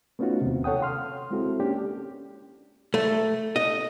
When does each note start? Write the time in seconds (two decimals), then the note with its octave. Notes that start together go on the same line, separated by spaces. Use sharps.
0.19 A3 B3 C#4 D#4 F4 F#4
0.41 D#2 C3
0.64 A4 C#5 F#5 G5 D#6
0.81 F5 C6 F6
1.31 G#3 C4 E4 F#4 A4
1.60 A#3 C#4 D4 G4
2.94 A3
3.56 D#5